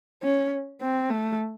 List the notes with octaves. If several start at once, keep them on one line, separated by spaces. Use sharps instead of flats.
C#4
C4
A3